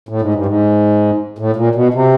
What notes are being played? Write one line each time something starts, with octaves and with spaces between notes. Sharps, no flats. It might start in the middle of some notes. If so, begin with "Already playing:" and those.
A2
G#2
G2
G#2
A2
A#2
B2
C3